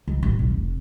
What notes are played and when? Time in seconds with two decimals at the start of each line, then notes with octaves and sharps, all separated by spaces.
0.08 C#2
0.23 A1
0.39 B1
0.50 F1